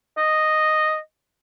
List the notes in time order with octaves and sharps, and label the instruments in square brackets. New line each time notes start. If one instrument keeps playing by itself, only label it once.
[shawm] D#5